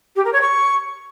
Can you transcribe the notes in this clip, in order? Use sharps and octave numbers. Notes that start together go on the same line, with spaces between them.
G4
A#4
C#5
C#6